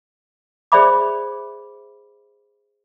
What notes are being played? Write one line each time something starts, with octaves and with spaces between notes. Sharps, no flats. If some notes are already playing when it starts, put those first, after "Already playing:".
G#4 C5 D5 E5 B5 D6